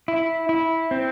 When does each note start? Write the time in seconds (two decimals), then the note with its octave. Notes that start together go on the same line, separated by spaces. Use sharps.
0.08 E4
0.49 E4
0.91 C4